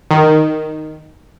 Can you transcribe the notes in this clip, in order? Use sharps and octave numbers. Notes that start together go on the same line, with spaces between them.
D#3